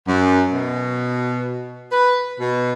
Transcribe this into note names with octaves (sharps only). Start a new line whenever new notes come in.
F#2
B2
B4
B2